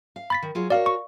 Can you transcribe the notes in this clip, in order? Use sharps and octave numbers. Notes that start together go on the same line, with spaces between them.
F5
B5 A6 B6
D#3
F#3 F4 G#4
F#4 A#4 C#5 D5 F5
C#6